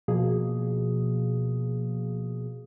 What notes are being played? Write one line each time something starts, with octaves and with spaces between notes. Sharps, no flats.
B2 F3 A#3 G#4